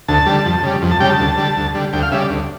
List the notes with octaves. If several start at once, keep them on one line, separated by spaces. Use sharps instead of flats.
D2 A5
D3 G3
F2
C#3 G3
F2
A5
C#3 G3 G5
A5
D2
D3 G3
D2
D3 G3
D2 G5
F5
C#3 G3 E5
D5
D2